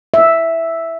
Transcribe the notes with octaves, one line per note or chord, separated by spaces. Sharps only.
E5